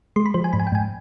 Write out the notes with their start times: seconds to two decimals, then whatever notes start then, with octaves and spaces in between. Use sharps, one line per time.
0.16 G#3 C6
0.26 B5
0.34 F3 C5
0.44 G#5
0.53 G#2 B5
0.60 G#5
0.67 G5
0.72 G#2 G#5